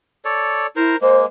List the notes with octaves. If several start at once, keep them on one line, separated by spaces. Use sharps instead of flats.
A4 C#5 D5
E4 A#4 C5 A#5
G#3 A#3 C5